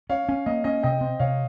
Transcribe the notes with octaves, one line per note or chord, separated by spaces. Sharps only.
C#4 C#5 F5
C#4
A#3 D#5
C#4 D#5
C3 D#5 G5
C4
C3 C#5 F5